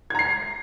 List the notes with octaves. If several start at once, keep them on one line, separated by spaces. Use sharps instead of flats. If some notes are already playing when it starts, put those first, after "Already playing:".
A#5 G#6 C7